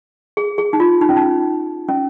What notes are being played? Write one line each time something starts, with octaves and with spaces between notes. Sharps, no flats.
G#4
G#4
D#4
F4
D#4
C#4
D#4
C#4